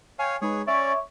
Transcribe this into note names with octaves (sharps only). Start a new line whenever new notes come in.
C#5 F5 G5 G#5
G#3 D#4 G#4 B4 C#5
C#4 C#5 D5 E5 D6